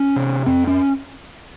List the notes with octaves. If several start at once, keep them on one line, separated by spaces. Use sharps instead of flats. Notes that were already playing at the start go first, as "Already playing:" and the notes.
Already playing: C#4
C3
F2 C4
C#4